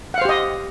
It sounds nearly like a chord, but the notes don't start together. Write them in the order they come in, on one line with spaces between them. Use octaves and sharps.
F#5 F5 C5 G4 D#5